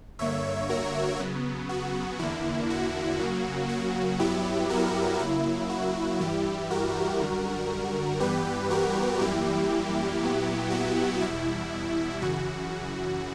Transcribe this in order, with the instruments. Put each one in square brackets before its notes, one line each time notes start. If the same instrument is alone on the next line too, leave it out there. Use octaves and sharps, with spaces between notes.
[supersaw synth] G2 D3 A#3 C#5 E5
F#4 A#4
C#3 F#3 B3
F#4
E2 D3 A#3 E4
F#4
C#3 F#3 A#3
F#4
G2 F#3 B3 E4 G4
F#4 A#4
C#3 F#3 A#3 E4
F#4
G2 E3 G3 E4 G4
F#4 A#4
F#2 D3 G3
G2 E3 G3 B3 G4 B4
F#4 A#4
F#2 E3 G3 A#3 E4 G4
A#2 F#3 B3
F#4
E2 B2 G3 E4
F#2 C#3 E3 F#4